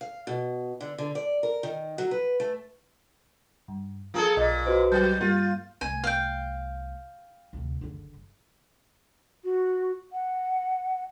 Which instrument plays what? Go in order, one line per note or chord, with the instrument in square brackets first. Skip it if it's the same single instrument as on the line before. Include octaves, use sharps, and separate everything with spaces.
[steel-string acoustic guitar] F5
B2
D3
D3
D5
A#4
D#3
F#3
B4
A3
[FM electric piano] G2
[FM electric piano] F3 [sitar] A#3 G#4 A4
[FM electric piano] B1 D#5 [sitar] A#2
[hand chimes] F#4 B4 C5
[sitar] F#3 [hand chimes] G6
[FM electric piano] G2 G3 A#3 [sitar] F4
[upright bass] C2 A3 [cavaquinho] G#5
[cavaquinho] F5 G5
[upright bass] D2 C3
F#1 D3
[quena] F#4
F#5